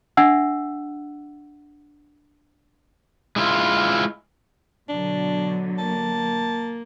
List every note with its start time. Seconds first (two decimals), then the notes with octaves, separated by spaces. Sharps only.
0.17 D4 E5 F#5 E6
3.36 G#3 E4 F4
4.89 B2 D3 F#3 D4
5.78 A#3 A5